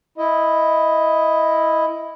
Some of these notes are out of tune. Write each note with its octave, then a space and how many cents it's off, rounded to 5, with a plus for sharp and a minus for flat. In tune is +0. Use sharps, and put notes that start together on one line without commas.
E4 +0 D#5 +10